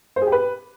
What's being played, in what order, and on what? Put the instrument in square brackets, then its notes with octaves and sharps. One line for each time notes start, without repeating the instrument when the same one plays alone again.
[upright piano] C5
G#4
G4
B4